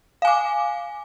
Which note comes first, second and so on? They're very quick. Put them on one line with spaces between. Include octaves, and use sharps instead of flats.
F5 G#5 D6